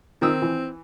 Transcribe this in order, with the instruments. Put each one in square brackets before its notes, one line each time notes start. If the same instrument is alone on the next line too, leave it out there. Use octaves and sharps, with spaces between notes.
[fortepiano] D#3 D#6 E6 [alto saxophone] C4
[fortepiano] E3